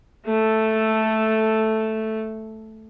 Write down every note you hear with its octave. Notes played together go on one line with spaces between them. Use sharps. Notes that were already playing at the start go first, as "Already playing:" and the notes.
A3 A4